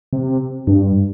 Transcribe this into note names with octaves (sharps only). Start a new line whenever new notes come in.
C3
G2